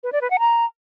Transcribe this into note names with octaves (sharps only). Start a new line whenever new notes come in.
B4
D5
B4
F#5
A#5